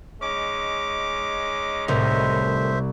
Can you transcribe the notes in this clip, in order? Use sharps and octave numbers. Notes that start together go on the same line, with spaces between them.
G#3 C#4 D#4 D6
C2 A2 D#3 C5 E5